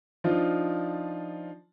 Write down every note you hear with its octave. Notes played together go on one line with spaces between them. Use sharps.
F3 D4 D#4 F4